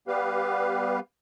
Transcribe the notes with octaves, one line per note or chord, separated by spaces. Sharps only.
G3 B3 G4 B4 F5